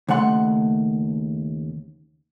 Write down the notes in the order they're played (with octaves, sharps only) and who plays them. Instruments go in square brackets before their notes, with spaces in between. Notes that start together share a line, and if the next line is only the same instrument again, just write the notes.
[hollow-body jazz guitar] D#2 C#3 A3 F#5 C6